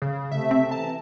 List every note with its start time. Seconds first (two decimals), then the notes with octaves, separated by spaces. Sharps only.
0.02 C#3
0.32 C3 A3 E5
0.51 C4
0.71 E3 A5 A#5